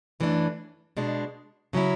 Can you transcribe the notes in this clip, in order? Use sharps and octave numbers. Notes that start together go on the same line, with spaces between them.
F#2 E3 A3 D4
B2 G#3 D4
C#3 F#3 C#4 E4